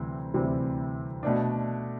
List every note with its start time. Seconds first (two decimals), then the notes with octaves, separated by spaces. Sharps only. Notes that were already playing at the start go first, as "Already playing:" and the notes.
Already playing: D2 C3 E3 G3 C4
0.34 D2 C3 E3 G3 C4
1.23 B2 A3 D4